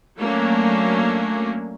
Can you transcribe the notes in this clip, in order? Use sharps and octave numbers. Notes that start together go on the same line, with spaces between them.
F#3 A3 A#3 C#4 D4